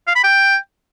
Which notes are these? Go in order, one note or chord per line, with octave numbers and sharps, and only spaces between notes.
F5
B5
G5